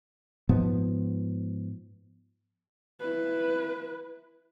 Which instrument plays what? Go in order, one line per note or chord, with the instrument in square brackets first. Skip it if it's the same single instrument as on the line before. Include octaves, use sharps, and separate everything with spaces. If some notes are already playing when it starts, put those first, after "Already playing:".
[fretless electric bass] G#2 F3 B3
[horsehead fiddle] E4 B4